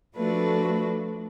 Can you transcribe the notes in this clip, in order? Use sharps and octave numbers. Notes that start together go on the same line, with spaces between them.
F3 A3 D4 F#4 A4 B4